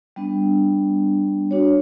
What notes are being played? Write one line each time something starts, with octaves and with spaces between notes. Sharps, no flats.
G3 B3 D4
D4 F#4 C#5